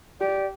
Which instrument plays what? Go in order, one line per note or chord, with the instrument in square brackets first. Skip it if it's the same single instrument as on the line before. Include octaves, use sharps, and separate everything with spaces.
[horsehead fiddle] G4 [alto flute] D5